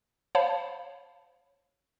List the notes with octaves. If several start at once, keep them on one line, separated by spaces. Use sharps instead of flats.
C5 C#5 F5 A5 B5